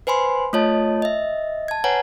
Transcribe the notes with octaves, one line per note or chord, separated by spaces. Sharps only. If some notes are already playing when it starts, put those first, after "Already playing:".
B4 C5 G#5 B5 C6
A3 F4 C#5 D#5 A5
D#5 E5
A5 G#6
B4 C#5 F#5 G#5 A#5